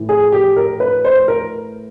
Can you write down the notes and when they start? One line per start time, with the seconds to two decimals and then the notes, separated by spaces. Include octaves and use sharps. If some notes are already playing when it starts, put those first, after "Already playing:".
Already playing: A2 E3
0.09 G#4
0.32 G4
0.56 A#4
0.80 B4
1.05 C5
1.28 A#4